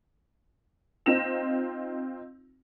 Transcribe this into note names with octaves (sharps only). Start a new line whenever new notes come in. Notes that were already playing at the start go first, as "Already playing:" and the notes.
C4 D#4 F4 A#6 E7 F7